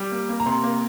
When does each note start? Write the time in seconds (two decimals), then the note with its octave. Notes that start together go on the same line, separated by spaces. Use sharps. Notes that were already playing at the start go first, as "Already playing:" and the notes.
Already playing: G3
0.12 A#3
0.29 A#3
0.40 A#5
0.46 C3 C6
0.64 A#3